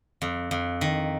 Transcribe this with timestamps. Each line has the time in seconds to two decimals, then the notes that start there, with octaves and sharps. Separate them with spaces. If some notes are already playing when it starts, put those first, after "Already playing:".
0.22 F2
0.51 F2
0.81 D#3